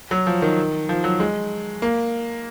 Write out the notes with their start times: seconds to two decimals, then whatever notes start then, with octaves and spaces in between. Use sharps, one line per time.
0.11 F#3
0.27 F3
0.42 D#3
0.89 F3
1.04 F#3
1.20 G#3
1.82 A#3